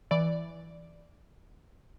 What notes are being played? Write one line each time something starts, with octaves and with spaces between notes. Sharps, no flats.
E3 D5